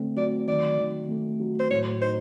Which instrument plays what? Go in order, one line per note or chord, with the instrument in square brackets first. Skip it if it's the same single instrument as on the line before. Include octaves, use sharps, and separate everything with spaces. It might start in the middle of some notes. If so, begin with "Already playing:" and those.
Already playing: [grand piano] D3 A3 C4
[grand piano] F#3 [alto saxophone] D5
[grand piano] D#3 [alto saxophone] D5
[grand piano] D#3
A3
F#3
[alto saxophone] C5
[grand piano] A2 [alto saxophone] C#5
[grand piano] D#4 [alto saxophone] C5